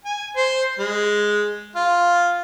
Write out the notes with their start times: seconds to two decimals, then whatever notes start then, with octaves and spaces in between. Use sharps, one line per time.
0.05 G#5
0.36 C5
0.79 G#3
1.76 F4